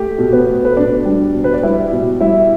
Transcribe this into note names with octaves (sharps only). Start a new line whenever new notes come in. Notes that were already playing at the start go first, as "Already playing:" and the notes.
Already playing: A3 G4
B2
B3 B4
A3
B4
B2 D4 D5
G3
B2
B4
D5
G3 E4 E5
B2
G3 E4 E5